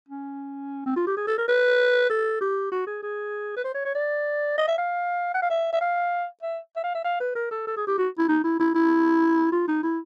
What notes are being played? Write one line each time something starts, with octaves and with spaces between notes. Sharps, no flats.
C#4
C4
F4
G4
G#4
A4
A#4
B4
A4
G4
F#4
G#4
G#4
B4
C5
C#5
C#5
D5
D#5
E5
F5
F#5
F5
E5
E5
F5
E5
E5
F5
E5
F5
B4
A#4
A4
A4
G#4
G4
F#4
E4
D#4
E4
E4
E4
F4
D#4
E4